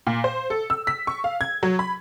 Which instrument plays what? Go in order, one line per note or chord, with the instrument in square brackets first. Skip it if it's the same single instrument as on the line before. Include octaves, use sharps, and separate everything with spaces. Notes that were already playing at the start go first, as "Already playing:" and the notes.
[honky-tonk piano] A#2
C5
A4
E6
B6
C#6
F5
G#6
F#3
B5